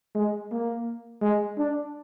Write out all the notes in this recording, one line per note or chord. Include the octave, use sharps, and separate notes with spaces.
G#3
A#3
G#3
D4